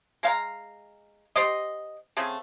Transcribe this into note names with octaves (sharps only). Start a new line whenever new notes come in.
G#3 F5 A#5
G4 C5 D5 D#5
C#3 A3 C4 G#4